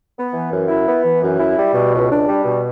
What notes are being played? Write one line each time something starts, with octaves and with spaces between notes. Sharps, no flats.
B3
E3
F#2
E4
B3
E3
F#2
E4
G3
B2
C#2
D4
G3
B2